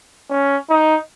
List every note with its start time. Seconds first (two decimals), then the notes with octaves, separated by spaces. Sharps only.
0.30 C#4
0.70 D#4